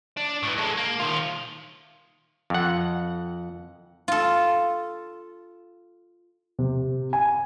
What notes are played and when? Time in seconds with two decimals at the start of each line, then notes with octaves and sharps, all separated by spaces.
0.17 D4
0.43 A2 E3
0.58 G#3 A4
0.77 A#3
1.00 D#3 F4
2.50 F2 F#5
4.08 F4 A4
6.59 C3
7.13 G#5